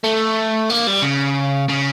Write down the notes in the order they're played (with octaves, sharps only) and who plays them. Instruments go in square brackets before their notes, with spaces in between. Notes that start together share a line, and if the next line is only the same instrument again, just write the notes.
[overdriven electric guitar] A3
A#3
G3
C#3
C#3